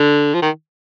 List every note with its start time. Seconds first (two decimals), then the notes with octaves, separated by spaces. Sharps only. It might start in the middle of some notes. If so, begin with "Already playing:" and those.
Already playing: D3
0.34 F3
0.42 D#3